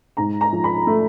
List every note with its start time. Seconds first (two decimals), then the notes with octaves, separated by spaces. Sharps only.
0.17 G#2 A#5
0.41 A#5
0.52 F3
0.64 B5
0.87 A3